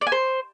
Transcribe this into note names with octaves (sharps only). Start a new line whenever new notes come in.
D5
G#5
C5